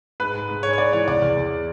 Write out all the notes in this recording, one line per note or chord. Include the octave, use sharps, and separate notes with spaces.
G#2 B4
G#2
G#2
G#3 C#5
C#5
G#2 D5
E3 C#5
E2 D5
E2
E2